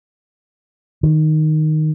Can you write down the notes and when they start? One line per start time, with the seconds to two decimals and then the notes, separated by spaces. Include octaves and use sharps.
1.03 D#3